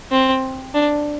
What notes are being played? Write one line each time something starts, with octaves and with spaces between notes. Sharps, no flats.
C4
D4